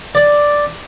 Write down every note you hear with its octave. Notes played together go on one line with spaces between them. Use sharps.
D5